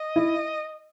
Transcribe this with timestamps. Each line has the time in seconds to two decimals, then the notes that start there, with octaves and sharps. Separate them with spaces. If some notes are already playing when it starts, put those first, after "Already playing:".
Already playing: D#5
0.16 E4